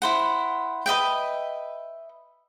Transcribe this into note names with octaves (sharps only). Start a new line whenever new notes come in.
E4 C5 F#5
B4 D#5 E5 G5